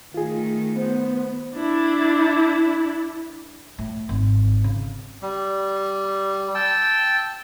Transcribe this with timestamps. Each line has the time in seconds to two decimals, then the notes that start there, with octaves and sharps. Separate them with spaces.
0.14 D#3 A3 F4 G#4
0.76 B3 C5
1.55 D4 E4
3.78 A2
4.09 G#1
4.64 C#3
5.22 G3
6.55 G5 A5 E6